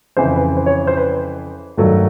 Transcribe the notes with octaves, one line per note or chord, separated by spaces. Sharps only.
F2 C#3 E3 C5
B4
C5
C#5
C5
B4
G2 D#3 F#3 A3 D4